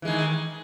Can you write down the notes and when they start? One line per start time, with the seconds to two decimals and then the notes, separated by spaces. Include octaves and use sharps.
0.02 E3
0.05 G#3
0.08 D#3